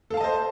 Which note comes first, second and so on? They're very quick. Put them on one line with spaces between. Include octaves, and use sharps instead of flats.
A4 F5 A5 D#5 C5